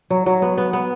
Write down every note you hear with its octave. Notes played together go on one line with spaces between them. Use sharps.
F#3
F#3
B3
B3
B3